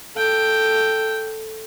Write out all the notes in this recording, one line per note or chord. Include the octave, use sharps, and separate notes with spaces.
A4 G5